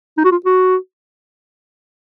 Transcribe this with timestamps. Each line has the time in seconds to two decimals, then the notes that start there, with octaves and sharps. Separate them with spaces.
0.18 D#4
0.24 F#4
0.32 F4
0.46 F#4